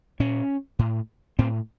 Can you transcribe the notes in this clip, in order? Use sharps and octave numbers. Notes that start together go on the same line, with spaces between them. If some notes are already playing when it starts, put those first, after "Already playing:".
A#2 C#4
A2
A2 C4